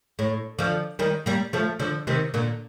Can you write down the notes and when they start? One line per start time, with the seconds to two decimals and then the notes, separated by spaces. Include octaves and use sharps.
0.19 A2
0.59 D3 F3
0.99 D#3 G3
1.26 G3 A#3
1.53 F3 A3
1.79 D3 F3
2.07 C3 D#3
2.34 A#2 D3